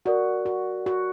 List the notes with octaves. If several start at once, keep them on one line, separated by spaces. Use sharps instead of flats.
F#4 A#4 D5 F#5
F#4
F#4